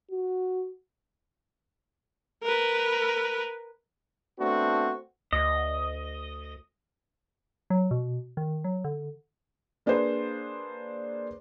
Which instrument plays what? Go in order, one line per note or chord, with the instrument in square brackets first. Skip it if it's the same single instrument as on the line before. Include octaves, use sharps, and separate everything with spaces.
[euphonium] F#4
[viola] A#4 B4
[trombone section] A3 B3 C4 D4 F#4
[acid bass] D2 [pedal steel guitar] D#5
[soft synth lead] F#3
B2
D#3
F#3
D3
[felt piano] A#3 D4 G#4 B4 C5